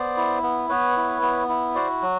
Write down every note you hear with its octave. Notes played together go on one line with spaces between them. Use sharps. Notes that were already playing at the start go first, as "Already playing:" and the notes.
Already playing: B3 C5 D5
E4
B3
B3 B4 C#5
E4
B3
E4
F#4 C5 D5
F#3